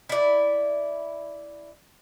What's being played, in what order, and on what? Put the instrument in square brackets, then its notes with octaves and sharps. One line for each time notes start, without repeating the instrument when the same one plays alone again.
[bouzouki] E4 D5